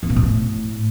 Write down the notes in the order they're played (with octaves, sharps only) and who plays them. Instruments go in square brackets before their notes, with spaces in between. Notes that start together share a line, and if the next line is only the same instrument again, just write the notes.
[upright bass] E2
A#2
B2
A2